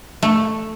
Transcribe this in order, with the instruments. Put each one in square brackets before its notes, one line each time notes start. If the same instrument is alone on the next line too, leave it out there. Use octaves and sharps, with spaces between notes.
[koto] A3